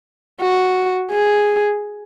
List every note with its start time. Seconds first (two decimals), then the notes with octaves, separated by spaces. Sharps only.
0.42 F#4
1.11 G#4